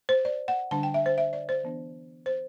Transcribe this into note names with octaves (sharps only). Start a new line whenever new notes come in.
C5
D5
F#5
D3 G3 D4 A5
G5
E5
C5
E5
D5
C5
E3 B3 D4
C5